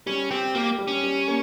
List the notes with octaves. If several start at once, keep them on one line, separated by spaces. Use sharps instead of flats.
G3 C#4
C4 G4
A#3 G4
G3
C#4
G3
A#3